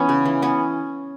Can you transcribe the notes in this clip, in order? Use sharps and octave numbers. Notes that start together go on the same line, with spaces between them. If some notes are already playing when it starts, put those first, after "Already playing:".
Already playing: E3 B3 C#4 D#4
C#3
E3
B3 C#4